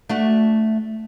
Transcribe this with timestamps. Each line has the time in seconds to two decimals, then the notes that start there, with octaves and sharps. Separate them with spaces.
0.09 A3 D4 F#4